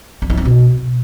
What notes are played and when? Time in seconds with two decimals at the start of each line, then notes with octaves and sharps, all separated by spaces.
0.22 D4
0.30 D#4
0.37 C4
0.45 B2